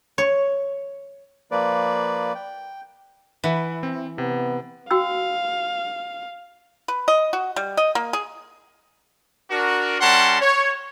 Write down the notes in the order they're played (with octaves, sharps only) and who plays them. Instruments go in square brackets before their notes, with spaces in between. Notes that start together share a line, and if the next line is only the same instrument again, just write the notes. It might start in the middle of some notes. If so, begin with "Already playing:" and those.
[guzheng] C#5
[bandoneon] F3 A#3 B4 D5
G5
[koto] E3 [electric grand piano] B4 F#5
[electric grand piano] C4
[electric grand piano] C3 [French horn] B3
[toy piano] F#4 G5 E6 [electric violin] F5
[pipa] B4
D#5
F#4
G3
D#5
A#3
G#4
[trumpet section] D4 F#4 A#4
G3 C#4 A#4 F#5 A5 C6
C#5